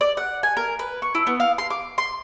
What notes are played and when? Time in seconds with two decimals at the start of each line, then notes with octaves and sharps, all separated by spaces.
0.01 D5
0.17 F#5
0.43 G#5
0.57 A#4
0.79 B4
1.02 C#6
1.15 E4
1.27 B3
1.40 F5
1.58 C6
1.70 D6
1.98 C6